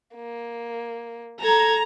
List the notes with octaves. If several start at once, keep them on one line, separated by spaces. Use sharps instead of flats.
A#3
A4 A#5 G#6